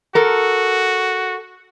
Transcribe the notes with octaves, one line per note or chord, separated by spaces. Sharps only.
F#4 A4 A#4